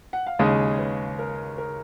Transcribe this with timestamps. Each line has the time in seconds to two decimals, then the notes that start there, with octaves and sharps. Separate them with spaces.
0.13 F#5
0.27 F5
0.39 D#2 C#3 G#3 D#5
0.73 C#5
0.78 B4
1.19 A#4
1.58 A#4